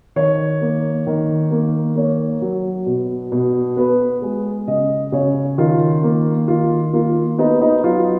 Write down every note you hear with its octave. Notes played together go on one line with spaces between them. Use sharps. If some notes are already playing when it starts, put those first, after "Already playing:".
D#3 C#5
A#3
D#3
A#3
A#3 C#5
F#3
B2
B2
B3 B4
G#3
C#3 D#5
C#3 C#5
D#3 F4
A#3
D#3 F4
A#3 F4
B3 D#4
D#4
F#3 F4